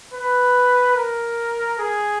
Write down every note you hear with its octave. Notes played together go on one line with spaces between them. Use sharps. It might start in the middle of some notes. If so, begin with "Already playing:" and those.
B4
A#4
G#4